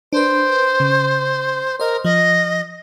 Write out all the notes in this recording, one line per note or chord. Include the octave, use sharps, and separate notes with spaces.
D4 B4 C5
C#3
A#4 C5 D#5
F3 D#5